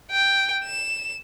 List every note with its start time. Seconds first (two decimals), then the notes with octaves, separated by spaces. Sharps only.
0.11 G5
0.63 E7